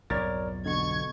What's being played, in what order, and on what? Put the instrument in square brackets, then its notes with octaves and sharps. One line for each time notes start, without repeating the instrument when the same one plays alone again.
[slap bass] B1 F2 G#2 [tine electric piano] A#4 C#5 D5 [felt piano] A6
[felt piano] B2 [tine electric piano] D3 [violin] C#6 G#6